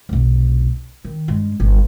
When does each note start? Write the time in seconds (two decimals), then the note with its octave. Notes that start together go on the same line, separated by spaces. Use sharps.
0.09 F1 B1
1.05 D#3
1.28 G2 G#3
1.60 G1